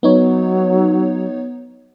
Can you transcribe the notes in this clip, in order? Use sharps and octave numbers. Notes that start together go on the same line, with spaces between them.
F#3 B3 D#4 C#5